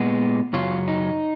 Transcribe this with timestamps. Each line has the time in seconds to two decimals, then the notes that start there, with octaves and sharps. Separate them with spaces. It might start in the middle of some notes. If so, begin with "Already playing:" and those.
Already playing: A#2 G#3 B3
0.53 F#2 C#3 F#3 C#4 F4
0.88 D#4